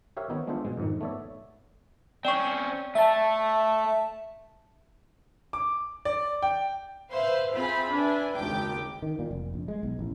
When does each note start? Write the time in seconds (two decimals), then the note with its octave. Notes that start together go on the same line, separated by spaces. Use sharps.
0.17 G4 A#4 C#5 E5 F5
0.29 D#3 B3 C4 D#4 C#5
0.47 G#3 B3 D4 F4 C5 E5
0.65 B2 G#3
0.78 F2 G#2 D#3
1.01 A3 B3 C#5 D5 E5
2.25 C4 C#4 D5 G5 C#6
2.95 A3 E5 A5
5.53 D6
6.05 D5
6.43 G5
7.12 B4 C5 E5 F5
7.55 C4 F4 G#4 E5 F5 B5
7.91 D4 B4 E5 G#5
8.37 G#1 D#2 C#3 G4 G5 D6
9.02 D#3
9.19 A#2
9.31 F1
9.54 A#1
9.68 G#3
9.83 B1
9.99 A1